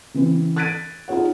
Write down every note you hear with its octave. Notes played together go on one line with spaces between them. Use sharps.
C#3 E3 C4
F#6 G#6 A6 B6 D7 D#7
D#4 F4 G#4 C#5 F#5